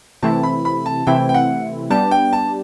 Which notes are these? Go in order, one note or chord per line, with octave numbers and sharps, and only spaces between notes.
C3 E3 A3 C4 E4 A5
B5
B5
A5
C3 E3 A3 C4 E4 G5
G5
F#5
G3 B3 D4 G4 A5
G5
A5